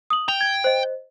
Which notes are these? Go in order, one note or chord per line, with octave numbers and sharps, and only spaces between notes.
D#6 F#7
G5 F7
G#6
C5 D#5